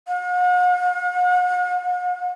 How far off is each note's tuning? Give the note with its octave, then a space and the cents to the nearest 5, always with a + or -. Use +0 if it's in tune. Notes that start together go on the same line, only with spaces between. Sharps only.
F#5 -45